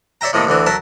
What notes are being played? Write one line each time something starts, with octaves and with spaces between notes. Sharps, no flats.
C#5 D5 E5 G5 A#5
A2 C3 D#3 A3 A#3
D2 D3 E3 C4
F#3 A#4 E5 A5